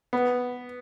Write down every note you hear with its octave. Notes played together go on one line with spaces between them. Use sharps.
B3